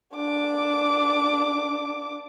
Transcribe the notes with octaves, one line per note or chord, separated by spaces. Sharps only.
D4 D6